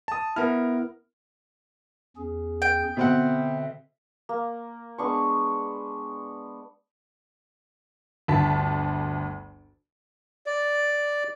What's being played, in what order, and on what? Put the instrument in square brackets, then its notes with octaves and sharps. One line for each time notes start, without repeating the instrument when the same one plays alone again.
[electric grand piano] A5 D#6
[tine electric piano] B3 E4 [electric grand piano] A#4 F6
[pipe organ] E2 C#4 G#4
[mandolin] G5
[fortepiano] B2 C4 F#5 [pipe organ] D3 E5
[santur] A#3
G#3 B3 D4 C#6
[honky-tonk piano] G1 D2 A5 B6
[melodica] D5